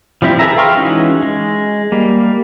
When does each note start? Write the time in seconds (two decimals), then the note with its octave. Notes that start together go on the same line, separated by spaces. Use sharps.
0.22 F3 G3 C4 E4
0.39 G#4 A4 B4 E5 A#5
0.57 F5 G5 C6 C#6 F6
0.77 E3 G#3 C#4 D#4 F#4
1.23 G#3
1.92 G3 A#3